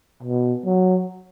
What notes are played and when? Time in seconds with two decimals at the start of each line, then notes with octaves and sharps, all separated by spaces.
0.23 B2
0.65 F#3